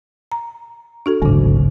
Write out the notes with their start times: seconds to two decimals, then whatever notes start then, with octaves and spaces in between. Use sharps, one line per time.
0.32 A#5
1.06 D4 F#4 A4
1.22 D1 G#1 G2 C#3